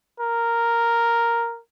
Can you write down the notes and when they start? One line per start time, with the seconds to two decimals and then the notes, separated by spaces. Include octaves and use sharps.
0.20 A#4